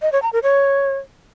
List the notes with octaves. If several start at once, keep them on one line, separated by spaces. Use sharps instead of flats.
D#5
C#5
A#5
A#4
C#5